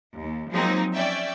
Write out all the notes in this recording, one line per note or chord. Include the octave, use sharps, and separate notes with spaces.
D#2
F3 F#3 G#3 A#3 C4 D#4
C#4 D5 E5 G5